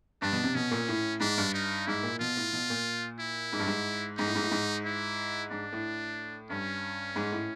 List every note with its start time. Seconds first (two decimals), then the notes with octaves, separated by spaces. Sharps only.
0.22 G2 D4
0.32 B2
0.44 C3
0.55 B2 C#4
0.71 A#2
0.89 A2
1.20 G#2 D4
1.38 G2
1.54 D#4
1.87 G#2 E4
2.03 A#2
2.19 B2 F4
2.37 A2
2.53 B2
2.70 A#2
3.20 E4
3.53 G#2
3.59 G2
3.67 G#2
4.18 G#2 D#4
4.27 A2
4.35 G#2
4.43 A2
4.51 G#2
4.85 E4
5.51 G#2 D4
5.73 A2
6.50 G2 C#4
7.16 G#2
7.32 A2